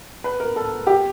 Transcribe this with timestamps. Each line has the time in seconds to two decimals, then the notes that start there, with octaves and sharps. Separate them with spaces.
0.24 B4
0.40 A#4
0.56 A4
0.87 G4